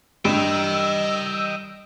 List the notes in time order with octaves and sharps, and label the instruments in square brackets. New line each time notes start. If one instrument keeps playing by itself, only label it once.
[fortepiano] G2 [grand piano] G3 [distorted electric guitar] D#5 G5 [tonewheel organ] E6